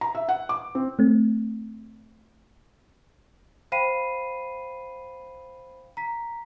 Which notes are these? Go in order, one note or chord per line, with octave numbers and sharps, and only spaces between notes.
A#5
E5
F#5
D6
C4
A3 C4
C5 F5 G5 B5 C7 D#7
A#5 B6